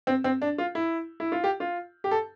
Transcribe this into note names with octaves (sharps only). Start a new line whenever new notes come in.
C4
C4
D4
F4
E4
E4
F4
G4
F4
G4
A4